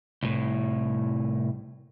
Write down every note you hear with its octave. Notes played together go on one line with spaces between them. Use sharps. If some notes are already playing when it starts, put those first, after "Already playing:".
C2 A2